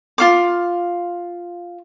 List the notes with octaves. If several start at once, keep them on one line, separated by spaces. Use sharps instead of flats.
F4 F5 D6